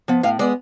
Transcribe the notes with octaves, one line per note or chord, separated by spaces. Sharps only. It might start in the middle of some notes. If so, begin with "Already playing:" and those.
F3 B3
A2 F5
G#3 B3 D5